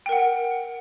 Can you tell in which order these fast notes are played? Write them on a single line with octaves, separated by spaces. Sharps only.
G5 A#4 F#5